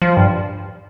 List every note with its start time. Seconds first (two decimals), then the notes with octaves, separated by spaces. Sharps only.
0.02 F3
0.17 G2